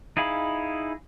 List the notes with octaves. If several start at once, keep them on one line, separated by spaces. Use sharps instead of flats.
D#4 E4 G#4 F5 B5